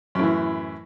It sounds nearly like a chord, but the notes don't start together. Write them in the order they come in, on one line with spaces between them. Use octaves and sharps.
F#2 A2 E3